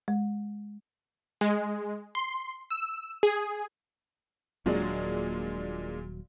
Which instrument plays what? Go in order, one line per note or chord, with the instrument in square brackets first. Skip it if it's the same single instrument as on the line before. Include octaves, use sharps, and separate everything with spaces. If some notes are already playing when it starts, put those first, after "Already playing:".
[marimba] G#3
[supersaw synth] G#3
C6
E6
G#4
[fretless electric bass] D#1 F#3 [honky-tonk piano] A#2 G#3 D4